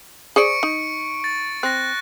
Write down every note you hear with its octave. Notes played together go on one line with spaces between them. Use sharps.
G#4 C5 D5 C#6 C#7 D7
D#4
A6
C4 F#6 A#6